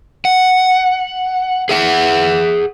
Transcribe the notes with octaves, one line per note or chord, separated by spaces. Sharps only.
F#5
G#4 E5 F#5